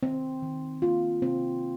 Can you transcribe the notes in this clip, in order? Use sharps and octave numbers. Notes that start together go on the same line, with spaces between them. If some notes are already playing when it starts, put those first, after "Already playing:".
D#3 C4
D#3
A#3 F4
C3 C4